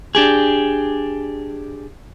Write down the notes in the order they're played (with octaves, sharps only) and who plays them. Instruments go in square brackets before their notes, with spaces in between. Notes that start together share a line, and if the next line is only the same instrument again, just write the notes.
[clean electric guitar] D4 G4 G#4